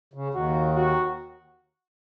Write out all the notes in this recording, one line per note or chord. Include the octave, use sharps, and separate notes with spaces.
C#3
D#2 D#3 F#4
F#4